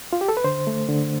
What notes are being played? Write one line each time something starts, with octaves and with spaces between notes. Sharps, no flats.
F4
G4
A4
B4
D3 C5
A3
D3